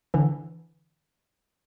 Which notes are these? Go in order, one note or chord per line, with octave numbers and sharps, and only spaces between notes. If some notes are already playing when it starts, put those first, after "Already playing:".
D3 E3